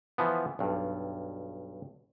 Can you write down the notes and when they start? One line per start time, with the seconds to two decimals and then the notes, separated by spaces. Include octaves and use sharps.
0.18 E3 F3 B3
0.59 B1 G2